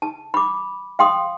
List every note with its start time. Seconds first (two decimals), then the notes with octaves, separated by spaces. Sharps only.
0.02 A5
0.34 B5 D6
0.99 F5 G5 C6 D#6